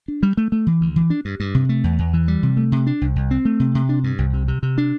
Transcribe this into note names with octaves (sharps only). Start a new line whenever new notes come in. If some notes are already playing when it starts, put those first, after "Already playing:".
D4
G3
A3
A3
E3
D2
E3
D4
G2
G2
C3
A3
E2
E2
E3
G3
C3
A3
C3
D4
C2
C2
C4
A3
C3
C3
D4
G2
C2
C3
C3
C3
D4